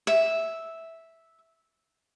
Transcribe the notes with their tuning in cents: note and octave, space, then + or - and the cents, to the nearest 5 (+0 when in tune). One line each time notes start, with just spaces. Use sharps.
E5 -5